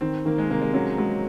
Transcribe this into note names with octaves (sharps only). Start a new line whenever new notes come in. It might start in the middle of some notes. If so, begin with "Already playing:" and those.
D#3 C4
D#3 A#3
G#3
C3 A#3
G#3
F#3 C#4
F#3 G#3